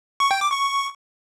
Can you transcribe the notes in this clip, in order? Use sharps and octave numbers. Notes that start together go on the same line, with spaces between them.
C#6
G5
D6
C#6